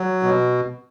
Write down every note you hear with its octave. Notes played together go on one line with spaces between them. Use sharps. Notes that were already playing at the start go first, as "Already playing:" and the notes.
Already playing: F#3
B2